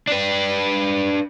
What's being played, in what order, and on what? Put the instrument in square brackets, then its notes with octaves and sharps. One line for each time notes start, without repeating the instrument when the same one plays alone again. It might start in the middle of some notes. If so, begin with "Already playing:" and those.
[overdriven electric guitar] D4 B4